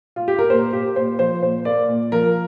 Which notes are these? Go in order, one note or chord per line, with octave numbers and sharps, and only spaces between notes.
F4
G4
A#4
A#2 C5
A#3 G4
A#2 C5
F3 C5
A#2 C5
A#3 D5
A#2
F3 A#4